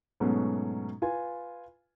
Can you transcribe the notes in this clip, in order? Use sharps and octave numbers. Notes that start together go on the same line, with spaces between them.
G#2 B2 F#3 A3 B3 C#4
F4 B4 G#5